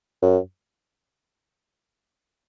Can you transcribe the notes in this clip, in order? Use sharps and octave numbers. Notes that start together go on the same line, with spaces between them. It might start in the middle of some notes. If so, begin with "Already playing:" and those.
F#2